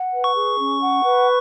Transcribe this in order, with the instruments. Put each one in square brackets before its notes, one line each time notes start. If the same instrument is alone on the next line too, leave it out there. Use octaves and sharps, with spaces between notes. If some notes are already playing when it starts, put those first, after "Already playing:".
Already playing: [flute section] F#5
B4
[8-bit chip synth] C#6
[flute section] G#4
C#4
F#5
B4